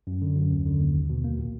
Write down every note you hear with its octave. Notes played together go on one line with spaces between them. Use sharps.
F#2
D3
F#2
D#2
D3
D#2
C2
B2
A#3
A#2